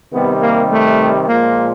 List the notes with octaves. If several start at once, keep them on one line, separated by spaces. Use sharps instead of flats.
C3 D#3 G3 B3
A#3
A3
A#2 F3 G#3 A#3